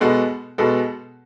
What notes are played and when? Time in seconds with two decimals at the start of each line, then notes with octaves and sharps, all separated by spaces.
0.01 B2 G#3 B3 F#4 A4
0.58 B2 G#3 B3 F#4 A4